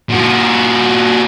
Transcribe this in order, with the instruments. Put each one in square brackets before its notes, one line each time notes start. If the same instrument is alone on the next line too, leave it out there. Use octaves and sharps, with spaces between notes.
[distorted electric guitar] A#2 F#4